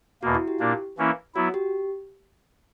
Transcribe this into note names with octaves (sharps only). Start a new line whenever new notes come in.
E2 B2 A#3 F#4
E4
G4
A#2 A#3 D4
E3 A#3 C#4 E4
F#3 B3 E4 F#4
G4